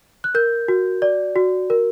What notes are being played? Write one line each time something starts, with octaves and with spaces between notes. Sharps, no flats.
F#6
A#4 G6
F#4
D5
F#4
A#4